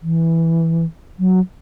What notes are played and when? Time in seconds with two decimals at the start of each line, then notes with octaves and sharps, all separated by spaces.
0.03 E3
1.19 F#3